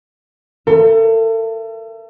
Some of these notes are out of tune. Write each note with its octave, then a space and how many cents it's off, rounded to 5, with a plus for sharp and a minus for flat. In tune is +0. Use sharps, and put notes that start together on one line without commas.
A4 +35 E5 +40